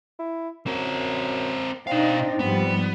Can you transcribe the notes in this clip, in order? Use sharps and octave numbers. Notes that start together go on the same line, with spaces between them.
E4
F#2 C4 A#4
B2 C4 D4 D#4 F5
G#2 F3 G3 B3